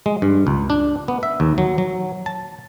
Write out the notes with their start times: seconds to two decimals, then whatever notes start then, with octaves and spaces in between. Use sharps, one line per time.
0.06 G#3
0.22 G2
0.47 C#2
0.70 D4
1.08 B3
1.23 E5
1.40 D#2
1.58 F#3
1.78 F#3
2.26 A5